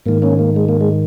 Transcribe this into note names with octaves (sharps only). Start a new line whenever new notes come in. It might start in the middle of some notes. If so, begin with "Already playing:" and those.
G#2 D#3 A#3
A#3 C#4
A#3
G#3
A#3
G#3